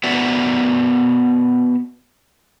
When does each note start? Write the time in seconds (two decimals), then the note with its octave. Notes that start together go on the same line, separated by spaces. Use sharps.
0.04 B3 F#4 D5 E5 F#5